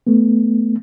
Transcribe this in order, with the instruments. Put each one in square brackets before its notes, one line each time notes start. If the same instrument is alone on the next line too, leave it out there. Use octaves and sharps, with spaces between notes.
[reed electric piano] A3 B3